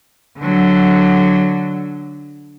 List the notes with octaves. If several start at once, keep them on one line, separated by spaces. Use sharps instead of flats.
D3 F#3